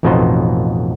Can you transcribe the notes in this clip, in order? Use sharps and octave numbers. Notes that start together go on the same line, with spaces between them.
A1 F2 B2 B3 D#4 C5